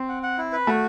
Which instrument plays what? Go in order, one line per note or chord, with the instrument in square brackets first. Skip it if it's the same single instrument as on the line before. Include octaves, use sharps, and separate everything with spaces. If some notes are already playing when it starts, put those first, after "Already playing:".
Already playing: [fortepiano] C4
[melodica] F#5
F#5
E4
B4
[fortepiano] A3 [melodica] F#4